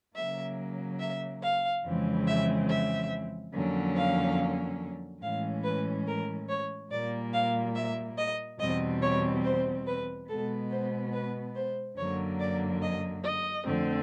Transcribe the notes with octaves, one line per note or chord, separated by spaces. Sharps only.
C#3 F#3 A#3 E5
E5
F5
F2 C#3 E3 G#3 C4
E5
E5
F2 D3 F#3 A#3 C#4
F5
A2 E3 G#3 C#4 F5
B4
A#4
C#5
A#2 G3 A#3 D5
F5
E5
D#5
E2 B2 G3 C4 D#5
C#5
C5
B4
B2 G#3 B3 A4
C5
B4
C5
F#2 D3 F#3 A#3 C#5
D5
D#5
D#5
F2 D3 F3 A3 C4